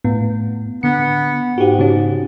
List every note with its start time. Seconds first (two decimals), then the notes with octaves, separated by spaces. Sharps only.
0.04 A2 B3
0.83 D3 B3 C#7
1.58 G#2 F#4 G4
1.79 C#3 C#4